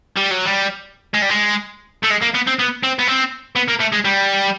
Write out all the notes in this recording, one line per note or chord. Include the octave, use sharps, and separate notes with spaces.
G3
F#3
G3
G#3
G3
G#3
A3
G#3
A#3
B3
C4
B3
C4
B3
C4
B3
A#3
A3
G#3
G3